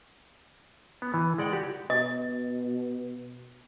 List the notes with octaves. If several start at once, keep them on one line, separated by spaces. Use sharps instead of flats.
B3
E3
G#3 D5 F#5 G5
F#4 G4
B2 D#5